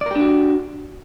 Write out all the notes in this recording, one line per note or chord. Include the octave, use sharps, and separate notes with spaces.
D4 F#4 G4 A#4 D5